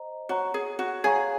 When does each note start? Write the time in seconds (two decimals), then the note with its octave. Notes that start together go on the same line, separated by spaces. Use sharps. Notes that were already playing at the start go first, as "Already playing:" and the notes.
Already playing: C5 D#5 A#5
0.29 F#4 C#5 F#5 A#5 C#6
0.54 G#4
0.79 F#4
1.04 G#4 C#5 F5 A#5 C#6